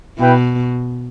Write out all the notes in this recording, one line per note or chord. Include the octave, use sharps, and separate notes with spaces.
B2 E4 B4 G5